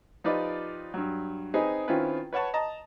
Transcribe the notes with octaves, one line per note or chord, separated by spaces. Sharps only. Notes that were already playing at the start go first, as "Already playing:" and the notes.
F3 D#4 F4 G4 B4 D5
G2 F#3
C4 D#4 G#4 B4
D#3 C4 C#4 E4 F4 B4
B4 C#5 F#5 A5 C#6
D#5 A5 A#5